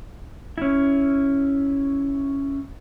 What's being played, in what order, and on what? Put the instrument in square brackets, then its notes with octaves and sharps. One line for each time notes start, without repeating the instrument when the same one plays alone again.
[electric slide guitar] C#4 E4